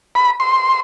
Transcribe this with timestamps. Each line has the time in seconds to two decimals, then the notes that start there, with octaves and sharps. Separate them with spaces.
0.15 B5
0.40 C6